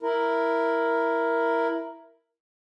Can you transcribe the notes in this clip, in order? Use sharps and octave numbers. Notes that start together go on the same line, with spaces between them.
E4 A#4